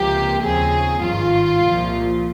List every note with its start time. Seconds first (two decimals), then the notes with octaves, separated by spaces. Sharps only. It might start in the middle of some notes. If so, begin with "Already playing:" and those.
Already playing: C#2 C3 F3 A#3 G4
0.42 D#2 C#3 F3 C4 G#4
1.02 G#1 G2 D#3 F4
1.62 C2 A#2 F3